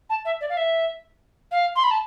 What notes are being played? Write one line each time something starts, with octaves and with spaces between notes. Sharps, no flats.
A5
E5
D5
F5
E5
F5
C6
B5
A5